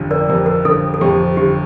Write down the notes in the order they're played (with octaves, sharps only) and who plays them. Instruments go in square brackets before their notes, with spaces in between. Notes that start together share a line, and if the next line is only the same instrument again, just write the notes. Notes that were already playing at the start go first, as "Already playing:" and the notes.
Already playing: [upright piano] G1 F2 C3
[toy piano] A#4 D5
[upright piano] F2 C3 [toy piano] A#4
[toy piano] A#4
[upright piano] G1 [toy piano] A4
[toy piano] A4
[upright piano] F2 C3 [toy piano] G4
[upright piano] G1 [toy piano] G4